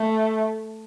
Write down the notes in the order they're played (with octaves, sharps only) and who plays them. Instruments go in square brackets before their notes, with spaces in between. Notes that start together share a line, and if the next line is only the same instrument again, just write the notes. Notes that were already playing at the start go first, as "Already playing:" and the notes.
Already playing: [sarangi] A3